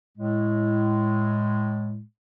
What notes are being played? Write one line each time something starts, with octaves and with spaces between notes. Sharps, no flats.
A2 G#3